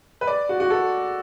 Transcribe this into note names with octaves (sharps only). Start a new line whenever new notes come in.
B4
D5
F#4
F#4
A4